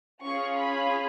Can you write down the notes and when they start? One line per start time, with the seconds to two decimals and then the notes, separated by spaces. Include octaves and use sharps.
0.23 C#4 F4 G#4 C#6
0.58 B5